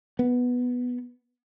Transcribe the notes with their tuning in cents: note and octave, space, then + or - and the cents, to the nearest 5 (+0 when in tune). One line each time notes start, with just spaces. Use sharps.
B3 +0